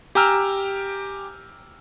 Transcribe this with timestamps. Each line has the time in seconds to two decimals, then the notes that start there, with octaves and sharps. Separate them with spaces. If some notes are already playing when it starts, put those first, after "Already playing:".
0.15 G4 G5 G#5 A#5 E6 F6